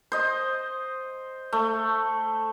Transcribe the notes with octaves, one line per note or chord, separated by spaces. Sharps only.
C5 D#5
A3